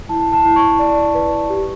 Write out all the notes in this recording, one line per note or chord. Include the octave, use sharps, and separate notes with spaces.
E4 A5
A5
E4
C#6
D5
B4
G4